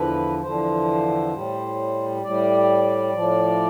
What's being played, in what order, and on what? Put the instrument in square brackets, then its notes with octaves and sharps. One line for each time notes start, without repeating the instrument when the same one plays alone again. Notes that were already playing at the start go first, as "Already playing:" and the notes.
Already playing: [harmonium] E2 D3 F3 B4
E2 D3 F3 C5
A2 G3
A2 G3 D5
A2 F3